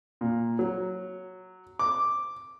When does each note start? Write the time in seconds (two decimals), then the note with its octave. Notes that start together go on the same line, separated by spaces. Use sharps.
0.21 A#2
0.59 F#3
1.79 D6